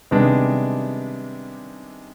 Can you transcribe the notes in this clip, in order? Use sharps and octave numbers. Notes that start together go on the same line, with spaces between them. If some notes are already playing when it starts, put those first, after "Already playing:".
C3 D#3 G3 G#3 B3 D4